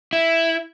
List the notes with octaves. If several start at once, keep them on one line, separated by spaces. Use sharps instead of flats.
E4